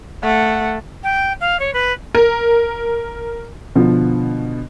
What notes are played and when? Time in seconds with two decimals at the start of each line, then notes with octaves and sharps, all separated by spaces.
0.24 A3 F#5
1.03 G5
1.40 F5
1.59 C#5
1.73 B4
2.15 A#4
3.75 B2 D3 F3